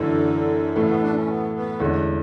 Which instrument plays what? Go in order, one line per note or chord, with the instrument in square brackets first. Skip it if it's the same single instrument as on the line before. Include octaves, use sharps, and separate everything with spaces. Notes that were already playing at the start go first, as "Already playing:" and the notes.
Already playing: [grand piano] F#2 E3 A3 [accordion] D3
[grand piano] A2 E3 A3 [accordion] C#3
[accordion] B3
D4
C#4
B3
B3
[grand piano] E2 D3 G#3 C#4